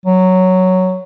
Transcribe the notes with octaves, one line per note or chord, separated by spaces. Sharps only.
F#3